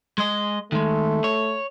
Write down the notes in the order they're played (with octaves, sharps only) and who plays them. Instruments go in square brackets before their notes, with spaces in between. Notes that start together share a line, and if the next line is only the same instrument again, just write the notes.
[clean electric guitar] G#3 D#5
[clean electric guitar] D#3 G#3 [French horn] A3
[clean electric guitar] C#5